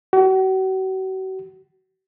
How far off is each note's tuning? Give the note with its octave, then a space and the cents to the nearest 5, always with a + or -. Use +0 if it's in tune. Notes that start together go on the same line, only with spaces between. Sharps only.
F#4 +40